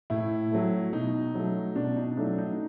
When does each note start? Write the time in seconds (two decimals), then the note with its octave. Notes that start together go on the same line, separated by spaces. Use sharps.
0.10 A2 E4
0.52 F#3 A3
0.93 B2 D#4
1.35 F#3 A3
1.76 B2 D4
1.96 D#4
2.17 F#3 A3 D4
2.38 D#4